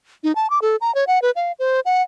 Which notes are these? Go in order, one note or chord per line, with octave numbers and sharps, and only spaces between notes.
D#4
A5
D6
A4
A#5
C#5
F#5
B4
F5
C5
F#5